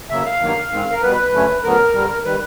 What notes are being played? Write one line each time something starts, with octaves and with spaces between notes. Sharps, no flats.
C#3 F#3 A#3 E5
F5
G2 D#3 F#3 A#3
G#2 D#3 G#3 C4
A#4
B2 G3 B3 B4
G2 D3 F#3 A3 C#4
D2 D3 F#3 B3 A#4
G2 D3 G3
D#3 G3 B4